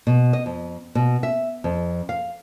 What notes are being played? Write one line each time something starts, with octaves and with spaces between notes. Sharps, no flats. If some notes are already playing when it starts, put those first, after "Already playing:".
B2
D#5
F2
B2
E5
F2
F5